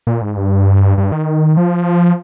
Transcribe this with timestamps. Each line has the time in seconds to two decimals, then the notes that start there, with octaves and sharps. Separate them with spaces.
0.07 A#2
0.22 G#2
0.37 G2
0.98 G2
1.12 D#3
1.57 F3